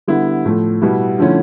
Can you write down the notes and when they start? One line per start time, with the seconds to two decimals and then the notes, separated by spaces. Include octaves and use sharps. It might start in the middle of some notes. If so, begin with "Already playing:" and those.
0.07 D3 G3 B3 E4
0.45 A2 F3 A3
0.82 B2 G3 B3 E4
1.19 D3 F3 A3 C#4 E4